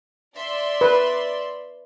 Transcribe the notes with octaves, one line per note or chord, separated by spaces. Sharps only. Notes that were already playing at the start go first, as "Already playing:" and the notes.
D5 E5 C6
B4